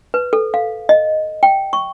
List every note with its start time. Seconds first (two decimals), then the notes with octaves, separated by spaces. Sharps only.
0.14 B4
0.33 A4
0.54 F5
0.89 D#5
1.43 G5
1.73 C#6